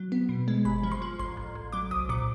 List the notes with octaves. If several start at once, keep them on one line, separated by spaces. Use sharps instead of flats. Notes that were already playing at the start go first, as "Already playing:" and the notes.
Already playing: F#3
B3
B2
G#3
G1 B5
F3
C6
F3
A1 C6
A1
A1
F#3 D6
C2 D#6
A#2 D6